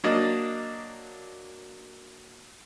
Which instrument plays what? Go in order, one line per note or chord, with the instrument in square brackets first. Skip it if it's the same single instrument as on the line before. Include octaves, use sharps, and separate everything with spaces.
[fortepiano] F#3 A#3 D4 D#5